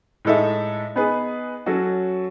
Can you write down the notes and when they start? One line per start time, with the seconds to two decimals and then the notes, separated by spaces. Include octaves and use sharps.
0.25 A2 G#3 D#4 A4 E5
0.96 B3 D#4 G#4 B4
1.66 F#3 C#4 F#4 A4